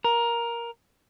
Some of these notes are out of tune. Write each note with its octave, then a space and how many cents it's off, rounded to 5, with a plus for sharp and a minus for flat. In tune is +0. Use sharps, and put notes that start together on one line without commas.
A#4 +10